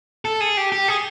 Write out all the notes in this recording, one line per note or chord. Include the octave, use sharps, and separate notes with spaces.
A4
G#4
G4
G4
G#4